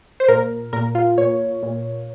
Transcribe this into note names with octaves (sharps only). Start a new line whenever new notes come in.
C5
A#2 A#4
A#2 A#4
F4
A#2 C#5
A#2